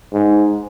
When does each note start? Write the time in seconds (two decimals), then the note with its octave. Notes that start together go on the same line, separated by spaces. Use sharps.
0.13 G#2